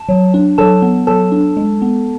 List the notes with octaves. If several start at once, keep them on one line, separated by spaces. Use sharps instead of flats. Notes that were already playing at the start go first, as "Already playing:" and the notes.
Already playing: A5
F#3
D4
F#3 A4 A5
B3
F#3 A4 A5
D4
G#3
B3